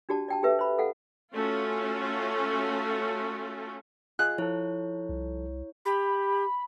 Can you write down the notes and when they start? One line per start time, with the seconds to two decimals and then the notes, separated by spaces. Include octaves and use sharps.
0.09 D4 F#4 G4 D5 A5
0.28 D5 G5 A5
0.43 G4 A4 B4 E5
0.59 C5 B5
0.78 A4 F5 F#5
1.33 A3 C#4 F4 F#4
4.19 F4 G#4 D#5 F#6
4.38 F3 E4 A4 C#5
5.09 C2
5.85 G4 B5